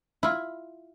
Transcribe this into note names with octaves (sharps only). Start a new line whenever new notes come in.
E4 F4